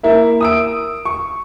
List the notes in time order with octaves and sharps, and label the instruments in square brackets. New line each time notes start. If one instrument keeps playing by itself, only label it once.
[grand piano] A#3 E4 A#4 E5
D#6 E6 D7
C#6